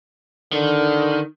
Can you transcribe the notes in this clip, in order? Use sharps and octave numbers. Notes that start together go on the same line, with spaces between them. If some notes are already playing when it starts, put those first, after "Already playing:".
D3 D#3